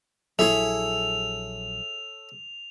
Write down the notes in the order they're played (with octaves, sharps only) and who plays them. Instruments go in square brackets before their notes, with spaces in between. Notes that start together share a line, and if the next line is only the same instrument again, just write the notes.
[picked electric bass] A#1 F#3 [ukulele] E4 G#4 E5 [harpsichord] A4 C#5 [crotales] F7